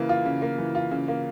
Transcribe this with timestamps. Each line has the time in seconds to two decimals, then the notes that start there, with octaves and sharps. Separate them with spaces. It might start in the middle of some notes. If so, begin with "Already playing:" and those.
Already playing: C#3 E3 A#3
0.09 F4
0.25 C#3
0.42 A#3
0.58 E3
0.75 F4
0.91 C#3
1.08 A#3